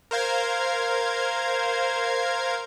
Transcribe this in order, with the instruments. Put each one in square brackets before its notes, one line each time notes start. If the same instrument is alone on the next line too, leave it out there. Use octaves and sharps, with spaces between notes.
[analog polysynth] A#4 C5 F5 G#6